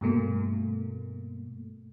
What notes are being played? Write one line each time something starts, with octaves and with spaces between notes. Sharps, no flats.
G2 B2 A3 A#3